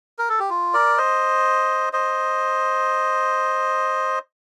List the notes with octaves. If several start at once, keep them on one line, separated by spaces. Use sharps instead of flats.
A#4
A4
G4
F4
A#4 D5
C5 D#5
C5 D#5